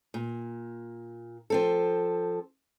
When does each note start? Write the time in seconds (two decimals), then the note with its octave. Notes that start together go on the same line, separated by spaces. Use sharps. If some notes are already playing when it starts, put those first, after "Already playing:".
0.14 A#2
1.50 F3 C4 A4